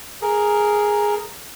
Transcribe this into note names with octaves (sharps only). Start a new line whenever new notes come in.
G#4 A#4